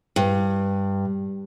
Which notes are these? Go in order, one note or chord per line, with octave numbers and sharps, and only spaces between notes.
G2